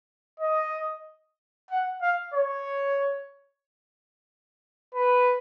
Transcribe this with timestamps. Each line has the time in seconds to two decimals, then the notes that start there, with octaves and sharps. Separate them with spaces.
0.40 D#5
1.70 F#5
2.02 F5
2.34 C#5
4.95 B4